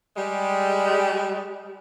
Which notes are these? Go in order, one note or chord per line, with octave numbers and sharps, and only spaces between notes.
G3 G#3